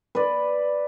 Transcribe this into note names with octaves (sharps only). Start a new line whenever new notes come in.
B4 D5